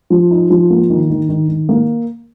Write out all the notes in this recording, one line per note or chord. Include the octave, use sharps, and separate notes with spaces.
F3
D#4
F3
A#3
D#3
D#3
D#3
D#3
A#3